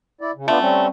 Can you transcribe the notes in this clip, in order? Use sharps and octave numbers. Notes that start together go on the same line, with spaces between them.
E4 D5
C#3
A3 B3 D4 F4
G3 C4 C#4